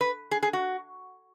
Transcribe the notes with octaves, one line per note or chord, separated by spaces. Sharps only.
B4
G#4
G#4
F#4